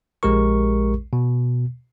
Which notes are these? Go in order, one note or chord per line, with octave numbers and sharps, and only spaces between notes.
A#1 G#3 G4 A#4 C#6
B2